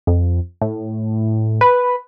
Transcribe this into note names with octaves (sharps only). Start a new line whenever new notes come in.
F2
A2
B4